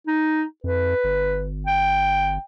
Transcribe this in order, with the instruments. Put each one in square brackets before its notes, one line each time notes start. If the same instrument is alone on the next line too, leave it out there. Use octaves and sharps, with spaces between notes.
[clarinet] D#4
[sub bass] F2 [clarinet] B4
[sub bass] G1
[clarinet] G5